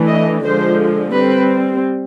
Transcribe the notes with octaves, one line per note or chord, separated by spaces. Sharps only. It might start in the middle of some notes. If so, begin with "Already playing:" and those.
Already playing: E3 A3 D4
D#5
D3 F3 G#3 C5
G3 C4 B4